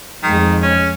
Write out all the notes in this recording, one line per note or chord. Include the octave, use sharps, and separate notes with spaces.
F2 D#3 F3 G#3
C#4